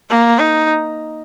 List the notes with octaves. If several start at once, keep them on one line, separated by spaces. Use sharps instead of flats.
A#3
D#4